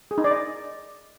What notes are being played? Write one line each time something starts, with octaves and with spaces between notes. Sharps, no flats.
G#4
D#4
D5
D#5